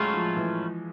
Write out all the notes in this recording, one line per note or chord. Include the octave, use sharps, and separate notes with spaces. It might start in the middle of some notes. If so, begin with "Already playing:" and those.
Already playing: A2 F#3 G#3 A3 C#4 F4
F3
E3